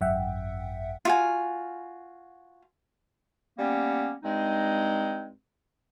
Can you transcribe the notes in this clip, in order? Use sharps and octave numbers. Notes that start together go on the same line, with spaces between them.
G#1 F#2 E5 F#5 G5
F4 F#4 G#5
G3 A#3 B3 C#4
G2 G#3 C4 D#4